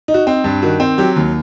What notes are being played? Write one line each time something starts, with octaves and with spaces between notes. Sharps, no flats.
D#4
F#4
C4
G2
D#3 F#4
C4
F#3 G4
D#2